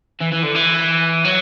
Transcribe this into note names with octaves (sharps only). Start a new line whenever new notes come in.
E3
E3
D3
E3
F#3